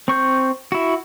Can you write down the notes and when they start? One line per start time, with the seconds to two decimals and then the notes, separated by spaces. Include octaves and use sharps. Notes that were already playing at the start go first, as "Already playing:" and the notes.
0.08 C4 C#6 G6
0.72 E4 F#4